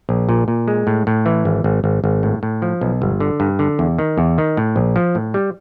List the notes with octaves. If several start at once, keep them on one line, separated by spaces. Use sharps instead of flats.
A#1
A#2
A#2
G#3
A2
A2
E3
G#1
G#1
G#1
G#1
A2
A2
F3
B1
G1
D3
G2
D3
E2
D#3
E2
D#3
A2
A#1
F3
A2
G3